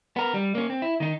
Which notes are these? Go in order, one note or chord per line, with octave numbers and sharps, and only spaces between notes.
B3 A#4
G3
A#3 C#4
C4
E4
D#3 D#4